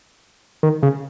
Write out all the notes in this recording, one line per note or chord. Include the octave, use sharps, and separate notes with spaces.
D#3
C#3